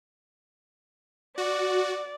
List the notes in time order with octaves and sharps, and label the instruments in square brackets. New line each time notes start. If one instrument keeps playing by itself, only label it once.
[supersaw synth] F#4 [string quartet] D5